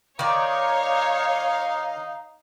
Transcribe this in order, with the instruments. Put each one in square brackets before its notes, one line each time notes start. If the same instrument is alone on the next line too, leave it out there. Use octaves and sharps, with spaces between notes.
[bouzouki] D#3 D5 [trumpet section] D#4 [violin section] C#5 [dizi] F5